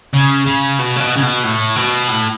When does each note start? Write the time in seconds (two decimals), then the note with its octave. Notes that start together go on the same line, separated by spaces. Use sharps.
0.14 C#3
0.46 C#3
0.79 B2
0.96 C#3
1.00 B2
1.16 C#3
1.22 B2
1.43 A2
1.76 B2
2.08 A2